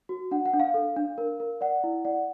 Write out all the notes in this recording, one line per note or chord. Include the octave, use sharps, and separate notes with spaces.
F#4
D4 F#5
F#5
D4
F5
A4
D4
A#4
A#4
D5 F#5
E4
D5 F#5